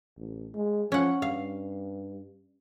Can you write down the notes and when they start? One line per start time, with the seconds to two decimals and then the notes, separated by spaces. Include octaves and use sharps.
0.18 A1
0.54 G#3
0.92 F3 C#4 F#5
1.22 G2 F5